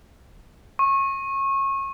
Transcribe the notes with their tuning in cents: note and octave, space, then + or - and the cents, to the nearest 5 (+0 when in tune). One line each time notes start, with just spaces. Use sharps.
C#6 -25